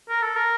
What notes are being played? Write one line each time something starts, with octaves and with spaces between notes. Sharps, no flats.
A#4
A4
A#4